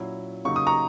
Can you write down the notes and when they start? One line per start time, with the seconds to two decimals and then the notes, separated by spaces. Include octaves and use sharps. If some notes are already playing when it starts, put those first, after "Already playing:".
Already playing: A#2 F#3 C#4 E4
0.45 C#3 F#3 A#3 D#4 C#6
0.56 D#6
0.67 A#5 C#6